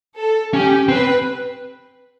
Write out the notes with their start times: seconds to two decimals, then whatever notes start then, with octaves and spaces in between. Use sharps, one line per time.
0.18 A4
0.54 C#4 G4
0.89 C4 B4